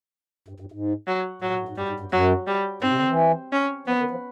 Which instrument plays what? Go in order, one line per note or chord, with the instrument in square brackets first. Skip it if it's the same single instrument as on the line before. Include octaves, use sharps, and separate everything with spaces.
[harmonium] G2
G2
G#2
[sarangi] F#3
[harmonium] A2 [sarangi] F#3
[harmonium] A#2
A2
G#2
[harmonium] G2 [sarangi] G3
[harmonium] G#2
G2
[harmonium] F#2 [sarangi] F#3
[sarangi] G3
[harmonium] G#2 [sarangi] C4
[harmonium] C3
D3
E3
[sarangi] C#4
[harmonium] F3 [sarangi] B3
[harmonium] D#3
F3